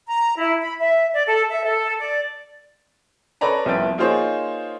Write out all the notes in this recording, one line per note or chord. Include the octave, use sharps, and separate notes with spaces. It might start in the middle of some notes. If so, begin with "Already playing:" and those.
A#5
E4
B5
E5
D5
A4
E5
A4
D5
A4 B4 C#5 D5 A#5 B5
C2 F3 B3 E4 G5 A6
A#3 D#4 F4 G#4 C5 C#5